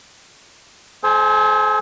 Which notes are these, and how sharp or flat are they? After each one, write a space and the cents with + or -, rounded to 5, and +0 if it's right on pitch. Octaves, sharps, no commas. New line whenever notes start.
A4 -45 C5 +0 G#5 +0